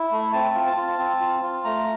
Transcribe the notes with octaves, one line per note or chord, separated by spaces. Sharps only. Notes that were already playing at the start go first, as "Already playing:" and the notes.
Already playing: E4
A3
C4 A5
F4
A5
F4
C4
F4
F4
A3 A#5